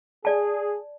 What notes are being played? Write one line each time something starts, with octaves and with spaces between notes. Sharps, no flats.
G#4 D5 A5